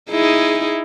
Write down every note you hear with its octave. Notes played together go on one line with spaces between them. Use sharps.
D#4 E4 G#4